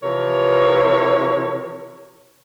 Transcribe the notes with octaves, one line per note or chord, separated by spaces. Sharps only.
C3 E3 F3 A#4 C#5